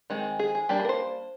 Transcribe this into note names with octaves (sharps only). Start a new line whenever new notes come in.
D#3 G#3 C4
G#4
G#4
G3 A#3 D4 G4
G#4
A#4
C5